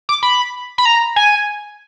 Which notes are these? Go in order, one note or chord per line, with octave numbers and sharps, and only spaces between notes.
D6
B5
B5
A#5
G#5